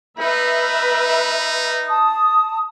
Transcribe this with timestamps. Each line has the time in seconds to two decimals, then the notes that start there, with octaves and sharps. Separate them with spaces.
0.20 D#4 B4 E5
1.88 A5 D#6